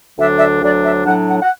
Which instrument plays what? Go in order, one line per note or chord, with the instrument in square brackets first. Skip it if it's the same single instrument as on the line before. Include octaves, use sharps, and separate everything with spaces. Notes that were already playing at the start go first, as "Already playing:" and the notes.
[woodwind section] D2 D3 F#3 D4 E5
E5
D5
D2 D3 F#3 D4 D5
E5
A2 F#3 D4 F#5
F#5
F#5